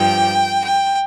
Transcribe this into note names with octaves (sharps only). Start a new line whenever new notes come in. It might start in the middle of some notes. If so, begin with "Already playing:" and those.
Already playing: G2 F3 G5
G5